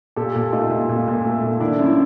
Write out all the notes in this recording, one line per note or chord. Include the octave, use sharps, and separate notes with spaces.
A#2 G4 A4
A#2
A3 D#4 F4
A#2
A#2
A#2
A3
A#2
D#3 D4 E4
F#2
E4